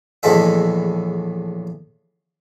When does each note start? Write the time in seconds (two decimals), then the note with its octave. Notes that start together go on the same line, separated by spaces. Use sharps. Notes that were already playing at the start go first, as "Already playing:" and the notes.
0.23 A#1 E2 A2 G#3 A4 E5